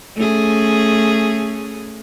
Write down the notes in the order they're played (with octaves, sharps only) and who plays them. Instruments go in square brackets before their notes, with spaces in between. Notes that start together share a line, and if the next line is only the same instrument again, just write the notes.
[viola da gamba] A3 C#4 G#4